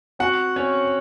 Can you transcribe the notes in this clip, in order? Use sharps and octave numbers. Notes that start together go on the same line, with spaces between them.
C4 F#4 F#5
C4 C#4 C#5